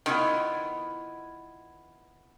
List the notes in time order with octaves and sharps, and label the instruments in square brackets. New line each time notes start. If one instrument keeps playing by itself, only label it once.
[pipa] D#3 [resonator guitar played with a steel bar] B3 E4 F4